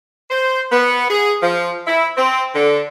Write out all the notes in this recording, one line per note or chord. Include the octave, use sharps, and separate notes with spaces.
C5
B3
G#4
F3
E4
C4
D3